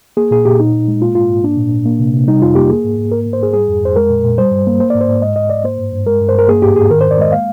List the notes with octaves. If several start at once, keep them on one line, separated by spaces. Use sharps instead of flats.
A#3 G#4
A#2 G#4
A#2 G4
A#2 D#4
A#2
G#3
A#3 F4
G#2 F4
G#2
A#3 D4
A#2
A#2
A#3
C3
C3
G3 D#4
F2 F4
A#3 G4
A#3 G#4
G#2
G#2
A#3 A#4
G#2
C5
G#2 G#4
G3 G#4
F2
F2 C5
G#3 A#4
A#2
A#2
G3 C5
G2
A#3
A#3 C5
D5
G#2
C5
G#2
G#3 D#5
G#2 D#5
G#2 D5
A#3 C5
G2
G2
G#3 A#4
G2
C5
G2 A#4
A#3 G#4
G#2 G4
G#2 G#4
D#3 A#4
C5
F2
D5
G#3 D#5
A#3 F5